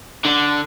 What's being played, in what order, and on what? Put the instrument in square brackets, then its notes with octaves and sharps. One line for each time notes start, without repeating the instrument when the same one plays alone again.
[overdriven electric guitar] D3